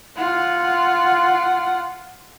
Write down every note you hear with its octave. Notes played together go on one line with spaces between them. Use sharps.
F4 F#5